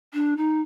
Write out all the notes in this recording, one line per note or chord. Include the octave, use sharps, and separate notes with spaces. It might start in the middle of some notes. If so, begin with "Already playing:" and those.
D4
D#4